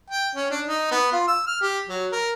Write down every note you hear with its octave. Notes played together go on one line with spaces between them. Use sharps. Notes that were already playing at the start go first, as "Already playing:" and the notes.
G5
C#4
D4
D#4
B3
F4
E6
F6
G4
F#3
A#4